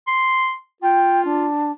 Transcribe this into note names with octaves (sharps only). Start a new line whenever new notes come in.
C6
F4 G5
D4